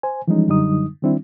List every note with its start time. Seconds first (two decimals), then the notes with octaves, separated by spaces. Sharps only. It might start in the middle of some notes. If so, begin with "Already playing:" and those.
0.03 C5 G#5
0.28 E3 F3 G3 G#3 C#4 D#4
0.48 F#2 D3 F#3 G3 D#4 D#6
1.02 D#3 G3 C4 D4 E4